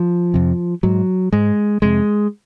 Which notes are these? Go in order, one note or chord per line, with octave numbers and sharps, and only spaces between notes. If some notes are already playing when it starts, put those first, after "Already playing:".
Already playing: F3
F2 C3
G#2 F#3
G#2 G#3
F2 C3 G#3